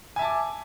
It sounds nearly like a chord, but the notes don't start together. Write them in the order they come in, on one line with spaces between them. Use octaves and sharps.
G#5 E5 A5 D6